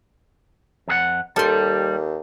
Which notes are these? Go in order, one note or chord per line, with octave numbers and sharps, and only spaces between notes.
F2 G#4 F#5
D#2 G3 A4 C6